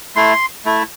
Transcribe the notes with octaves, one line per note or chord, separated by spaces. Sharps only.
A3 E4 C6
A3 E4